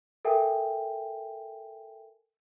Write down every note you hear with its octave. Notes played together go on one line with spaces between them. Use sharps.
A4 A#4 E5 G5 G#5